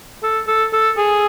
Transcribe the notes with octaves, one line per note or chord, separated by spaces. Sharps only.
A4
A4
A4
G#4